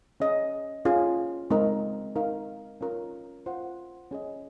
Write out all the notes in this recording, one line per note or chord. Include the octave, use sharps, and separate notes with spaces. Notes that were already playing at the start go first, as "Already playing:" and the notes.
C#4 G#4 D#5
C#4 F4 G#4
G#3 C4 D#4 A#4 D#5
D#4 A#4 F5
C#4 F4 A#4
F4 C5 F#5
C#4 G#4 D#5